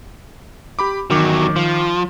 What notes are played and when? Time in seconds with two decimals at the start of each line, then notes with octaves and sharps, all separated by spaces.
0.79 G4 B5 D6
1.11 E2 D#3 F#3 D6
1.56 F3